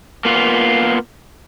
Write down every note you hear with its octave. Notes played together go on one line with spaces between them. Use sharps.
A#3 B3 F4